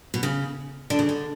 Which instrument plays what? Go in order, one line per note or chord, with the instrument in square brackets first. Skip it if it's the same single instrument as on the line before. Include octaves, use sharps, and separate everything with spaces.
[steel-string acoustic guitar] B2
C#3
[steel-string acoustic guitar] D3 [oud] D4
[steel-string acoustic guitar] C#3
D3